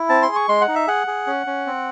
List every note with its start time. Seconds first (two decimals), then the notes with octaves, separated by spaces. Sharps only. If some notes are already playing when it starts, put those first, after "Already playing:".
Already playing: E4
0.09 C4 A5
0.22 C6
0.29 G#4
0.35 C#6
0.48 G#3 C6
0.61 F#5
0.68 D#4
0.75 E5
0.87 G#4 F#5
1.07 G#4
1.27 C#4
1.47 C#4
1.67 C4